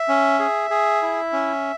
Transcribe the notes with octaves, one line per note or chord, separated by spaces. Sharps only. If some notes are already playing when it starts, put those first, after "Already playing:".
Already playing: E5
C#4
G#4
G#4
E4
C#4